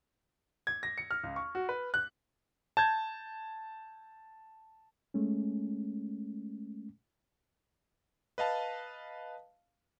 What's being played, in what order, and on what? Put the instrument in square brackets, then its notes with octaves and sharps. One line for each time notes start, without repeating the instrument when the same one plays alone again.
[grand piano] G#6
A#6
C#7
F6
C#2
C#6
F#4
B4
F#6
[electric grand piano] A5 G6 G#6
[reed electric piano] G#3 A3 C#4
[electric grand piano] B4 D#5 F5 A5